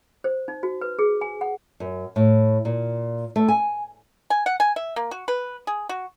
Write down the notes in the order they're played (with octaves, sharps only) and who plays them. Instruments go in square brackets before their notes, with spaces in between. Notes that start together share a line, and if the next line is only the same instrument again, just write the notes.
[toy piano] C5
D#4
F#4
B4
G#4
G#5
F#5
[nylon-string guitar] F#2
A2
A#2
A3
G#5
[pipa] G#5
F#5
G#5
E5
A#3
F#4
B4
G#4
F#4